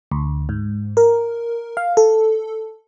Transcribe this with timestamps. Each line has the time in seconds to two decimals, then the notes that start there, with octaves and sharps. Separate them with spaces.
0.11 D2
0.49 G#2
0.97 A#4
1.77 F5
1.97 A4